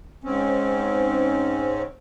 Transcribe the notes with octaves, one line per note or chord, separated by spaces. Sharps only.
G#2 C4 C#4